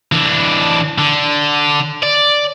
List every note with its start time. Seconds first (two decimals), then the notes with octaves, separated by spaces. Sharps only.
0.12 E3 D4
0.98 D3
2.03 D5